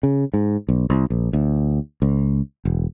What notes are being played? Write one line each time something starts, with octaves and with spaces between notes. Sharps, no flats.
C#3
G#2
B1
C2
A#1
D2
C#2
E1